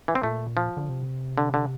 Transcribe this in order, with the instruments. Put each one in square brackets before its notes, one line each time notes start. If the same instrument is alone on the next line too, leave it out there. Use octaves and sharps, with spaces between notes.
[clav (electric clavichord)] E3
C4
[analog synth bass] A#2 [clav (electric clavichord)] A3
[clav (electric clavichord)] F3
[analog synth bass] D3
C3
[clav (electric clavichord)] D3
D3